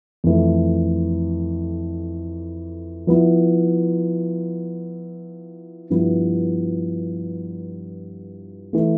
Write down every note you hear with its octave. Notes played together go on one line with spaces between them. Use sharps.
F2 E3 A3
F3 B3 E4
G2 F3 B3 E4
E3 A3